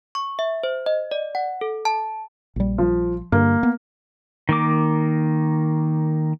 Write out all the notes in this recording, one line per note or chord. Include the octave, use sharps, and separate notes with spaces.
C#6
E5
C5
D#5
D5
F#5
A4
A5
A#1 G3
F3
G2 D3 A#3
B3
D#3 A#3 D6